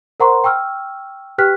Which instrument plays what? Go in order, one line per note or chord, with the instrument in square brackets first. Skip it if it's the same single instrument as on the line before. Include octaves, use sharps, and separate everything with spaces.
[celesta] A#4 C5 F#5 A#5 C6 C#6
G5 C#6 E6 F6
G4 B4 G5 F6 F#6 B6